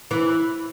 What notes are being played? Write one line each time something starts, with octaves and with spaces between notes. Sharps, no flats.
E3